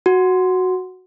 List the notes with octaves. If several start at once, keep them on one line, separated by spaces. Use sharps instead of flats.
F#4